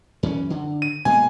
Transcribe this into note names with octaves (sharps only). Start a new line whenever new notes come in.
F#2 E3 C#4
D3
D#7
B2 G#3 A#3 G#5